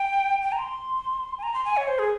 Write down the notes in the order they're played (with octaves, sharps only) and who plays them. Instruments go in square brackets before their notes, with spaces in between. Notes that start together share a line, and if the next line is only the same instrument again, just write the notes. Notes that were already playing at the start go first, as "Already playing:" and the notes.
Already playing: [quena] G5
G5
A#5
C6
G#5
A#5
C6
G#5
C#5
C5
G#4